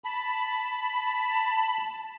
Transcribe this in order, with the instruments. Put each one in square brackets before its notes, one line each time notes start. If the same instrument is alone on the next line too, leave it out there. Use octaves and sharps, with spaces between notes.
[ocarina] A5 [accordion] B5